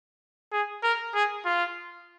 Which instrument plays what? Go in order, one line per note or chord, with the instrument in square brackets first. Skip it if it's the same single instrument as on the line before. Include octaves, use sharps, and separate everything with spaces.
[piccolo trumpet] G#4
A#4
G#4
F4